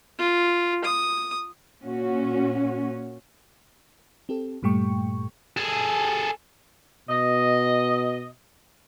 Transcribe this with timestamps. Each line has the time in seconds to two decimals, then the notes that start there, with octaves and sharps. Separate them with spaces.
0.19 F4
0.84 D#6
1.82 A#2 C#4 F#4
4.29 C4 G4 A4
4.63 G2 A#2 G3 A3 G5 C#6
5.57 G#4 A4
7.09 B2 D#5